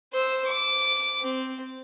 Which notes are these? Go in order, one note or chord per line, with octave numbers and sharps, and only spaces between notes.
C5 E6
D6
C4